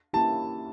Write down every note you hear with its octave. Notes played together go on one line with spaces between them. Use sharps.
A#3 C#4 E4 G4 A5